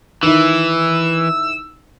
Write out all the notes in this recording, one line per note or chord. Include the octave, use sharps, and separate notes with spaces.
D#3 E3 E4 E6